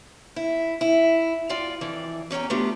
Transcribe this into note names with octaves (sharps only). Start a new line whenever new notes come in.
E4
E4
F4 D5 F5 G5
F2 E3 D5
E2 C#4 G4 G5 A#5
A3 B3 D4 F4 G4